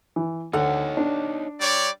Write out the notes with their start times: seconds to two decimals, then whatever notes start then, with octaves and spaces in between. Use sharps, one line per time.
0.16 E3
0.53 D2 D#4 A4 C#5 F#5
0.97 D4
1.60 G3 C#5 D5